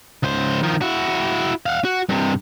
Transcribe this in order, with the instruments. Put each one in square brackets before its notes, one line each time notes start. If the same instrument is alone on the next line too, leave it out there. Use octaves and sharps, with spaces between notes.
[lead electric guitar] C#2 C5
D#3 F3
E4 F#4
F5 F#5
F#4
G2 C3